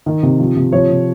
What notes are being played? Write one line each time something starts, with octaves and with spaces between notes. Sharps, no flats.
D#3
C3
F3
C3
F3 C#5
C3